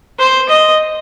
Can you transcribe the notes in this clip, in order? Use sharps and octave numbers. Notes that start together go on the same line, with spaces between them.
C5
D#5